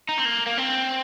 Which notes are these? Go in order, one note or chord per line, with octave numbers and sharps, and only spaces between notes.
D#4
C4
A#3
A#3
C4